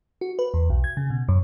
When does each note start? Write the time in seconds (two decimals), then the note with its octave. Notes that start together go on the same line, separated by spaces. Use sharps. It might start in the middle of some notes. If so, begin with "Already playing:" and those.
0.21 F#4
0.39 B4
0.54 E2
0.70 B1
0.84 G#6
0.97 C#3
1.10 B2
1.28 F#2